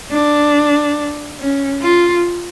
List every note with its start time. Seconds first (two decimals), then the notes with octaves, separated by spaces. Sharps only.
0.12 D4
1.40 C#4
1.82 F4